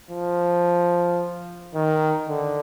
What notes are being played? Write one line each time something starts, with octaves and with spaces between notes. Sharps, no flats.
F3
D#3
D3